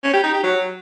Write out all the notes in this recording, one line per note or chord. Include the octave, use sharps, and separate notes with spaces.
C#4
G4
D#4
G4
F#3